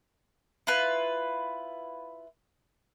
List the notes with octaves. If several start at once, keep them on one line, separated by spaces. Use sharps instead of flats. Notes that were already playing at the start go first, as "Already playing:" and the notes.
E4 F4 B4